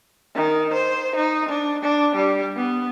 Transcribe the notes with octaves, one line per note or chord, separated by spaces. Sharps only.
D#3
C5
D#4
D4
D4
G3
B3